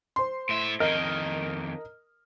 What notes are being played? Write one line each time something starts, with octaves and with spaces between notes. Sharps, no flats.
C5 C6
A2 E5
F2 D#3 A#4 D#5 F6